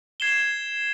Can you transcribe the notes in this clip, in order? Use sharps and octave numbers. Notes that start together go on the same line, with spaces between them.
G#6 C7 E7 G7